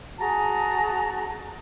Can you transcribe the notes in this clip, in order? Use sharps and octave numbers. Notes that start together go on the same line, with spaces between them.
F#4 G#4 A5 A#5